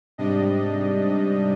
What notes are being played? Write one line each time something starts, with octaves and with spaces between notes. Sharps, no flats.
G#2 C3 G3 D4 D#5